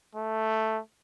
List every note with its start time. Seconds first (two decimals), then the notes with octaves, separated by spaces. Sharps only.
0.15 A3